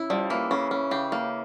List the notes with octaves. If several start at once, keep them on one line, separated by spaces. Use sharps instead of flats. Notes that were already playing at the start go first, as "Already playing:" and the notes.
Already playing: C#3 E4
F3 G3
E3 A#3
C#3 C#4
C#4
C#3 G4
A#3